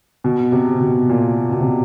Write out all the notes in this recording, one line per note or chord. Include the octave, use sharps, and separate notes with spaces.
B2
C3
B2
A#2
B2
C3